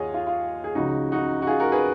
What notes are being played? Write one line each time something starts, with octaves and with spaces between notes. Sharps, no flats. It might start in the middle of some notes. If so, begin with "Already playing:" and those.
Already playing: D#2 D#3 F4 G#4 C#5 D#5 F5 F#5
F4
F4
G#4
C#2 C#3 F3 D#4 F#4
D#4 F#4
F#4
F4 G#4
F#4 A#4
G#4 B4